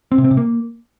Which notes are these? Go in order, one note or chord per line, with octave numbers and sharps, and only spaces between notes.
C4
C3
C4
C3
A#3